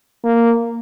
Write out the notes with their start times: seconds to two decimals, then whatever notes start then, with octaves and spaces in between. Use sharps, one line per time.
0.25 A#3